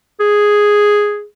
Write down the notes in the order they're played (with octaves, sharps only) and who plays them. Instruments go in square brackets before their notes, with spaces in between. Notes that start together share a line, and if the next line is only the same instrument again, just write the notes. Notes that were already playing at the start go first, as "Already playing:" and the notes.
[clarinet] G#4